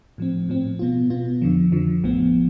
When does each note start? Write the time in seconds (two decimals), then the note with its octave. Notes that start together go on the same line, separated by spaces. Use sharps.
0.18 A2 F3 C4
0.49 A2 F3 C4
0.79 B2 B3 F4
1.10 B2 B3 F4
1.42 F2 D3 F3
1.72 F2 D3 F3
2.03 A1 A2 F3 B3